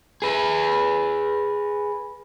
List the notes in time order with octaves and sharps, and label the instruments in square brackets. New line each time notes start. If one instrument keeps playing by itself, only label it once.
[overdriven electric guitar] G#4 B4